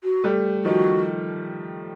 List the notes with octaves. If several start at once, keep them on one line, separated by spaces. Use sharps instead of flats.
F#4
G3 A3
D#3 F3 F#4